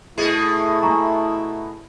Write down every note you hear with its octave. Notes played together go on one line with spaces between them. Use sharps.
B2 A3 E4 G#4
G#5 A#5 C#6